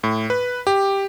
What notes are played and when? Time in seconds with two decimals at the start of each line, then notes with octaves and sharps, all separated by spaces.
0.04 A2
0.30 B4
0.67 G4